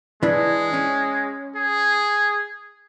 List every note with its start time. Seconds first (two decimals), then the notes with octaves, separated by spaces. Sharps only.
0.23 E3 G#3 D4
0.74 C#4
1.56 G#4